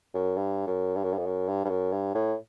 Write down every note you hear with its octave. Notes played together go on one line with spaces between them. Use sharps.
F#2
G2
F#2
G2
F#2
G2
F2
F#2
G2
G2
F#2
G2
A2